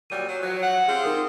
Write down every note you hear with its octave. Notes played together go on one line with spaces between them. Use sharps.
A#2 F#3 G3 D#7
F#3
D#3 F3 F#3
F#5
C4 F4 G4 G#4
D#4 A#4 D#6